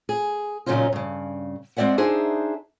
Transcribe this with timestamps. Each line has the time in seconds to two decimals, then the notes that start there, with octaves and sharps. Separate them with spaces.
0.09 G#4
0.66 A#2 C#3 F#3 C#4 D#4 F4
0.93 G2 C#3
1.77 G#3 C4 C#4 D5 E5 F#5
1.98 D4 D#4 G#4 C5 E5 A5